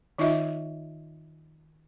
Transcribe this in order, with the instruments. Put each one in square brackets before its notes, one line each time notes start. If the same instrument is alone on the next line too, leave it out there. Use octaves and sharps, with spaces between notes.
[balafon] D#3 D#4 F4 D#5 E5